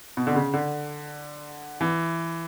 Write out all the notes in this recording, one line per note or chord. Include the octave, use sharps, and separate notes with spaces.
B2
D3
C#3
D3
E3